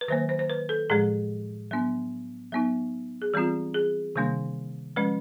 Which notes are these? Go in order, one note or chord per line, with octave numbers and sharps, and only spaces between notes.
B4
D#3 F#3 A#3 C5
C5
C5
B4
A4
A2 F3 G#3 G#4
F#3 B3 D4
F#3 B3 D#4
G#4
E3 G3 C4 F4 G4
G#4
C3 D#3 G3 A#3 D4
F3 G#3 C#4 B4